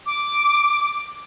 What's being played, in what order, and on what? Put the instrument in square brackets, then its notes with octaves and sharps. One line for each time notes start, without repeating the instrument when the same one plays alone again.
[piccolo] D6